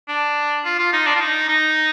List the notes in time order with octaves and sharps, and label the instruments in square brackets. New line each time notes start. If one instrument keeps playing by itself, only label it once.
[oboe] D4
F4
F4
D#4
D4
F4
D#4
D#4